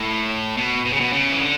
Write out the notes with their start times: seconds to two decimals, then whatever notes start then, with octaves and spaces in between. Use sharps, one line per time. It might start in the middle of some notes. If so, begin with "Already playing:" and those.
Already playing: A2
0.57 B2
0.85 B2
0.93 C#3
1.00 B2
1.13 C#3
1.32 E3
1.41 D3